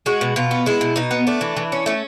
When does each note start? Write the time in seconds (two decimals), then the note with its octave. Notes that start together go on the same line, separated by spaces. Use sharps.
0.06 G#3 F#4
0.21 B2
0.36 B2 F4
0.51 B3
0.66 G#3 E4
0.81 B2
0.96 B2 D#4
1.11 B3
1.27 A3 D4
1.41 E3
1.56 E3
1.72 C#4
1.86 A3 C#4